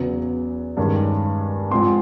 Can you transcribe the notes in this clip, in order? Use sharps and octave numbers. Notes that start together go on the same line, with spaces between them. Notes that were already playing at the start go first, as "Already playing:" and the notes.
Already playing: E2 C#3 F#3 B3
G2 D#3 G#3 C#4
G#2 F3 G#3 C4 C6